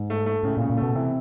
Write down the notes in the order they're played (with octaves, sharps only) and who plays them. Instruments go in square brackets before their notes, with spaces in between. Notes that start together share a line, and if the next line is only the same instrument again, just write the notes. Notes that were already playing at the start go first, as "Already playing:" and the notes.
Already playing: [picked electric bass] G#2
[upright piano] A3
A3
[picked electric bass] A2 [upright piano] C#3
[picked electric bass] A#2
[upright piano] C#3
[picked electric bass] A#2
[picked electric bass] B2 [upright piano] A3
[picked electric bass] C3 [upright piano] E3